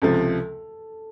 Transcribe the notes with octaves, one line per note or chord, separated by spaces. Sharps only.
C#2 C3 F3 A4